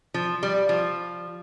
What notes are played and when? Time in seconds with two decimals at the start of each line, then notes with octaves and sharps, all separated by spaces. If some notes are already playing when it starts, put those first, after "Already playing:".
0.14 F3
0.43 G3
0.69 F3